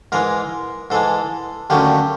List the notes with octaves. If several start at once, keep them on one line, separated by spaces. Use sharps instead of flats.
G#2 E3 G#3 A#4
G#2 E3 G#3 A4
D#2 D3 F#3 A3 C#4 G4